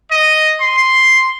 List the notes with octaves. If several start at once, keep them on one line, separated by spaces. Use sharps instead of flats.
D#5
C6